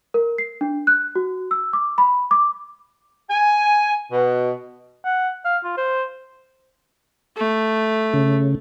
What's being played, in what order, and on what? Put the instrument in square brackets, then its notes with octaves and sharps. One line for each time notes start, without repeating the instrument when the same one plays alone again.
[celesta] A#4
C7
D4
F#6
F#4
E6
D6
B5
D6
[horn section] G#5
B2
[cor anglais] F#5
F5
F4
C5
[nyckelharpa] A3
[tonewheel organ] C#3